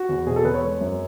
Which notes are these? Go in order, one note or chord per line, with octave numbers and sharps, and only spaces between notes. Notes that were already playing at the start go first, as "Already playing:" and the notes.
Already playing: F#4
E2
B2 G#4
A4
E2 B4
C#5
G#3
F#2